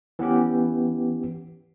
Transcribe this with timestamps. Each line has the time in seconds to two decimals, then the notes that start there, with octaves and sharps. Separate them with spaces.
0.19 E3 B3 C#4 G4